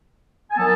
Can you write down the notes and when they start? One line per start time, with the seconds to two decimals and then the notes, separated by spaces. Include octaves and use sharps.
0.51 G#5
0.56 D#3 F#3 B3 A5